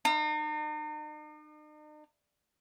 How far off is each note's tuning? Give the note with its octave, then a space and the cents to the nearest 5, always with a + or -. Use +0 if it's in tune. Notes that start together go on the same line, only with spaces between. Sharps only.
D#4 -45